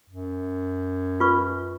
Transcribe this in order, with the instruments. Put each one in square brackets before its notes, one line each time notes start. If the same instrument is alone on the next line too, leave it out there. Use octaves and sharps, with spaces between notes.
[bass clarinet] F#2
[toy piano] F4 B4 C#6